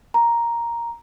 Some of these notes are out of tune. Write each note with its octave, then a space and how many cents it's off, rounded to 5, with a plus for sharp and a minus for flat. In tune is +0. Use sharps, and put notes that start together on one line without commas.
A#5 +5